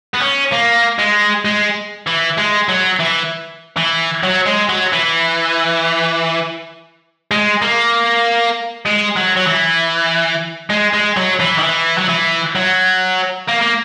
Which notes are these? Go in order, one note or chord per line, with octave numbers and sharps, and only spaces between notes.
B3
C#4
A#3
G#3
G#3
E3
G#3
F#3
E3
E3
F#3
G#3
F#3
E3
G#3
A#3
G#3
F#3
F#3
E3
G#3
G#3
F#3
E3
D#3
E3
F#3
E3
F#3
A#3
A#3